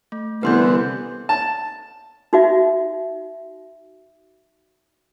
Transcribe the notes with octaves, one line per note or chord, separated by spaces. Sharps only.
A3
C2 D3 E3 B3 B4 C6 G6
A5
D#4 F#4 E5